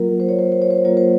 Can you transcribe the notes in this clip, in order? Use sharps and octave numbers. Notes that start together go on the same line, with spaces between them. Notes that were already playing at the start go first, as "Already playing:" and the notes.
Already playing: F#3 A#3 F4 A#4
C5
C#5
C5
C5
C#5
C5
F#3 A#3 F4 C#5
C5